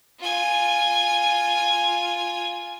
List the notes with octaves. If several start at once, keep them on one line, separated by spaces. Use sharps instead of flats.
F4 G#5